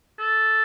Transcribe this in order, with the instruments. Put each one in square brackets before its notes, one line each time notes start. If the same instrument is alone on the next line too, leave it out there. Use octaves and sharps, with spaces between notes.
[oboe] A4